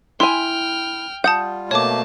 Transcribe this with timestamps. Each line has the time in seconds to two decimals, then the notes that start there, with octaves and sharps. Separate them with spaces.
0.20 E4 G5 G#5 C6 F6
1.24 G3 F4 F#5 A5 D#6 G6
1.71 B2 A3 A#3 C#5 A5 D6